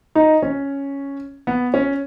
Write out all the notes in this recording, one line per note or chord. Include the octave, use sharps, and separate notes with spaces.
D#4
C#4
B3
C#4